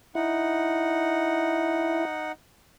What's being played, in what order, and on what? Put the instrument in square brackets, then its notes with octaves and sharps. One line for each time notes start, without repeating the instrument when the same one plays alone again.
[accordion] D#4 F#5 [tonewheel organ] E4